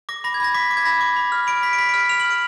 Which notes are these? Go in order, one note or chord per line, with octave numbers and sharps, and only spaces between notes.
D6 A#6
B5 A#6
G#6
B5 A#6
D6 B6
D6
G#6
B5 A#6
D6
B5
F6
B5 D7
B5 B6
D7
B5 B6
D7
F6
D7
F6 F7
F6 F#7
D7